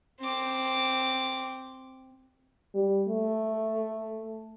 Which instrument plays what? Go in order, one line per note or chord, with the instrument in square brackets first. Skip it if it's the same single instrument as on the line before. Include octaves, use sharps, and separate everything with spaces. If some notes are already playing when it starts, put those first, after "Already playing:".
[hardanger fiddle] C4 D6
[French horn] G3
A3